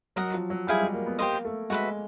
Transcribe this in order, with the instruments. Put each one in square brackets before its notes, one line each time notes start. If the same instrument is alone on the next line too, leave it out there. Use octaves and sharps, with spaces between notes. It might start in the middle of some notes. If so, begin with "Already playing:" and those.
[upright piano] F#3 [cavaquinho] A#4 D#5 F#5
[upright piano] F3
F#3
[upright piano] G3 [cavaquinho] E4 G#4 C5 F5
[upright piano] G#3
A#3
B3
[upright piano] A#3 [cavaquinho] G4 C5 D#5
[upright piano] A3
[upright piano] G#3 [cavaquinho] F#4 B4 E5